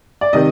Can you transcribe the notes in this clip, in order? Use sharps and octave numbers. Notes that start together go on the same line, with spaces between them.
D5
C3 D#3 D#5